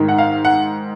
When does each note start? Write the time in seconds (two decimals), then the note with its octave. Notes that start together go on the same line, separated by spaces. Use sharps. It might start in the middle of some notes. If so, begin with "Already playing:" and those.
Already playing: G#2 D#3
0.08 F#5
0.18 F5
0.45 F#5